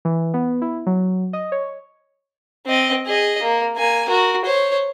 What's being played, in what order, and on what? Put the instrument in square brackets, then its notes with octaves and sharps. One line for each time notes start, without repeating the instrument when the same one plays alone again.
[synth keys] E3
B3
E4
F#3
D#5
C#5
[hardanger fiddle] C4 D#5
G#4 D#5
A#3
A#3 G#5
F#4 A#4
C5 C#5